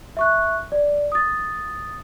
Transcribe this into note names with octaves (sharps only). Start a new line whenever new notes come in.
E5 C#6 F#6
D5
D#6 A6